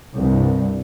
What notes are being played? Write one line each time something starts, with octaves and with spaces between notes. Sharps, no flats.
C2 G2